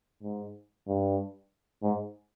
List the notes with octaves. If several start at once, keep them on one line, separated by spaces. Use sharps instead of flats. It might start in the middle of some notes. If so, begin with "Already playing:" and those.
G#2
G2
G#2